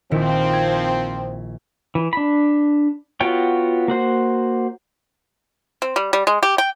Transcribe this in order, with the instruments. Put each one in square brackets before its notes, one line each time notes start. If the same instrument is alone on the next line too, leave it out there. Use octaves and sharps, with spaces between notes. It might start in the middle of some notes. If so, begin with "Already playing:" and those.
[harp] A#1 D#3 E4 [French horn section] F3 C4
[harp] G#6
[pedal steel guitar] E3
D4 B5
B3 F4 F#4 C#5 G5
A#3 F#4 C5
[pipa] C4
G3
G3
G#3
G4
G5